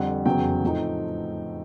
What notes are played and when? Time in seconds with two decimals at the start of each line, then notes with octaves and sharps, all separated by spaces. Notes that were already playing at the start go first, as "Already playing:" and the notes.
Already playing: F2 D3 G3 F#5
0.26 F1 E2 C#3 F#3 G5
0.63 A2 F3 A3 C4 D#4